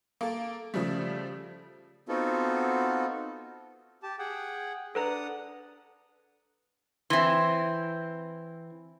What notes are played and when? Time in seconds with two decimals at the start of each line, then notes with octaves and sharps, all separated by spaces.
0.21 A#3 A4
0.74 C#3 F3 G3 A3
2.09 B3 C4 D#4 F4 F#4 A4
4.03 G4 A5
4.19 G#4 F#5 G5
4.95 D4 A4 B4 F#5 A#5 D#6
7.10 E3 C4 E5 C6